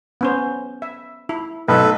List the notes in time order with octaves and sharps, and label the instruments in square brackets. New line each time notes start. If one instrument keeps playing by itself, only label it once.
[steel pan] B3 C#4 C5
E5
E4
[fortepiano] B1 [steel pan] A3 D#4 [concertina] A4 B4